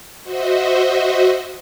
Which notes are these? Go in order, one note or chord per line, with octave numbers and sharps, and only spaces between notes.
F#4 C5 D#5 E5